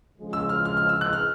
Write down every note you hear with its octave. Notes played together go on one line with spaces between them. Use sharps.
C#3 F3 G#3
E6
F6
F6
F6
E6
F#6
F6